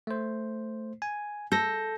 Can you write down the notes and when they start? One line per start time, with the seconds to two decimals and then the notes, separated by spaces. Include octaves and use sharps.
0.07 A3 C5
1.02 G#5
1.52 A4 G6 A#6